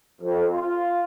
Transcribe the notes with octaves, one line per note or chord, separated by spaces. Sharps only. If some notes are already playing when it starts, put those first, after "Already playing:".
F2
F4